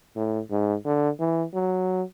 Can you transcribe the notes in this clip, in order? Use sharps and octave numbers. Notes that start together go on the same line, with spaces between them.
A2
G#2
D3
E3
F#3